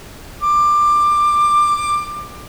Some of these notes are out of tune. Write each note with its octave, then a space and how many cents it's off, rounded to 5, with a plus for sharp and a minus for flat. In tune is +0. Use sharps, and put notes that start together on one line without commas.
D6 +15